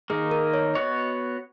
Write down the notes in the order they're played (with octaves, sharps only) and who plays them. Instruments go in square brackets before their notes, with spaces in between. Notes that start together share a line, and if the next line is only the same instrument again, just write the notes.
[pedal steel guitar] D#3 A#3 D#4 [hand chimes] G#4
[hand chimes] A#4
C#5
[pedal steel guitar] B3 F#4 C#5 [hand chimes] D#5